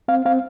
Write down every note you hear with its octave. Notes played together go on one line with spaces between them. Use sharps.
C4 F5
C4 F5